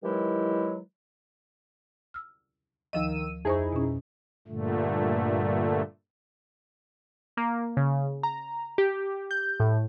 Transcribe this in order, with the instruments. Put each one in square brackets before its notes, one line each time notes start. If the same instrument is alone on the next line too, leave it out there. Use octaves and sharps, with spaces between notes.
[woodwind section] D#3 E3 F#3 G#3 E4 G4
[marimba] E6 F6
[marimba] D2 F3 D#5 [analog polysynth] D#3 E6 D#7
[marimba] F2 C5 C#6 [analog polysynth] D#4 E4 G#4
[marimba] B2 C#4
[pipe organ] G2 A#2 D3 A3
[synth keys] A#3
C#3
A#5
G4
G6
A2